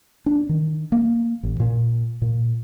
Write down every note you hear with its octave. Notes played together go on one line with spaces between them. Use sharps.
D4
D#3
A#3
A1
A#2
A#2